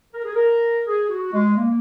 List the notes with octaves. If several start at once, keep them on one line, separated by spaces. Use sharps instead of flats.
A#4
G#4
A#4
G#4
F#4
G#3
A#3